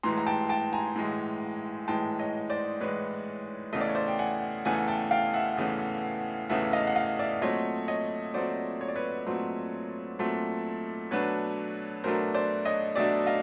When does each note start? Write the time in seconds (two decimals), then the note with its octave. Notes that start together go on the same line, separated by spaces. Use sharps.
0.03 A2 E3 G#3 A#5 C6
0.18 A#5
0.27 G5 A5
0.49 G5 A5
0.73 G#5 A#5
0.96 A2 E3 G#3
1.88 A2 E3 G#3 G5 A5
2.19 C#5 D#5
2.50 C5 D5
2.81 A2 E3 G#3 B4 C#5
3.73 E2 C#3 E3 A3 D#5
3.81 D5
3.88 C#5
3.95 C5 D5
4.08 G5
4.19 F#5 G#5
4.65 E2 C#3 E3 A3 F#5 G#5
4.88 G5 A5
5.11 F5 G5
5.34 E5 F#5
5.57 E2 C#3 E3 A3
6.49 E2 C#3 E3 A3 E5 F#5
6.73 D#5 F5
6.87 F#5
6.96 D#5 F5
7.19 D5 E5
7.42 A#2 F#3 A3 C4 C#5 D#5
7.88 C#5 D#5
8.34 A#2 F#3 A3 C4 C5 D5
8.81 C#5
8.88 D5
8.96 B4 C#5
9.26 A#2 F#3 A3 C4
10.19 A#2 F#3 A3 C4
11.11 B2 F#3 A3 D4 B4 C#5
12.04 B2 F#3 A3 D4 A#4 C5
12.34 C5 D5
12.65 C#5 D#5
12.96 B2 F#3 A3 D4 D5 E5
13.26 D#5 F5